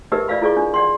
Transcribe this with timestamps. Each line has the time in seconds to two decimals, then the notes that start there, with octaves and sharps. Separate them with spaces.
0.12 D#4 G4 A#4 B4 D#5 E5
0.28 F4 D5 E5 F5 B5
0.41 E4 F4 G#4 D5 C#6
0.57 D4
0.74 D5 F#5 C6